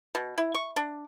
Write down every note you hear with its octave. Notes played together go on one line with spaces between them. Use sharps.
B2
E4
C#6
D4